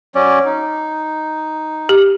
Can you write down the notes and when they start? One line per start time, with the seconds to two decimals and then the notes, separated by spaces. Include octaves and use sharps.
0.15 F#3 C#4 D5
0.45 D#4
1.89 G4